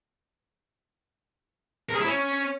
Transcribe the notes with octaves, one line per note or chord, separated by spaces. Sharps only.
A#4
G#4
E4
C#4